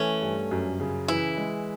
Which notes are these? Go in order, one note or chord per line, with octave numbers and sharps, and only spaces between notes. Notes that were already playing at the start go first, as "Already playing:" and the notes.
Already playing: E3 A3 C#4
G2
F#2
C#3
E3 E4
G#3